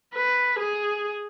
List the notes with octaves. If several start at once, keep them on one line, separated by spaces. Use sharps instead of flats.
B4
G#4